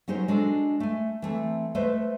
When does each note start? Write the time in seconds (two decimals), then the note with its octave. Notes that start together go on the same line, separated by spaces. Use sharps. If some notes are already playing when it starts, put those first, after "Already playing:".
0.08 F#3 C#4 D#4 G4 A#4 C5
0.28 G#3 D4 F#4 A4
0.80 A3 G#5
1.22 E3 A3 C4
1.75 A3 B4 C5 D#5 E5